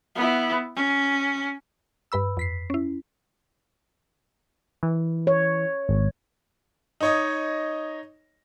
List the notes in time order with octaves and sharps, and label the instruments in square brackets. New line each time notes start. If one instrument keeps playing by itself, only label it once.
[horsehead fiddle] B3 E4
C#4
[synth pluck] G2 B4 B5 E6
F2 B6 C7
C#4 E4
[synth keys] E3
[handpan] C#5
[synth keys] G#1
[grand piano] D#4 C#5 D#5